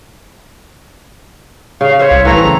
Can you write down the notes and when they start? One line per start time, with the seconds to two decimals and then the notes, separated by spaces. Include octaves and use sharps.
1.81 C#3 F5
1.99 C5 C#5 E5 F5
2.11 C2
2.25 E3 A3 C4 A#5
2.44 C#3